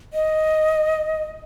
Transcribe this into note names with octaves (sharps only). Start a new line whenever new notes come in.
D#5